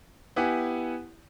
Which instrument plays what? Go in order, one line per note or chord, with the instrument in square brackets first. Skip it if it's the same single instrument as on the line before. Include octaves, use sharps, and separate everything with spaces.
[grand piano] B3 E4 G4 F#5 G#5